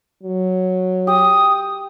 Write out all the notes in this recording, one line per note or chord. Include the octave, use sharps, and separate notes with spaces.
F#3
G4 D#6